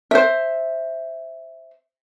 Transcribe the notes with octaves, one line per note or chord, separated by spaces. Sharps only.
C5 E5